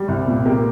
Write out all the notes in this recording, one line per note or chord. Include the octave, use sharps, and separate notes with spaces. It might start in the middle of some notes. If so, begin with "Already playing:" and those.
Already playing: G3
C2
A#2
A#3 G4